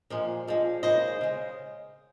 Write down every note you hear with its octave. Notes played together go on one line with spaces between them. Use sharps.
A#2 F3 G#3
A#2 F3 G#3
D#2 C#3 G#3 C5 D#5
C#3 G#3